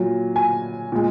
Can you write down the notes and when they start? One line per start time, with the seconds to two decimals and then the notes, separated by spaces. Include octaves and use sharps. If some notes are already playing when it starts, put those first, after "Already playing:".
Already playing: A#2 F#3
0.36 G#5
0.92 A#2 G#3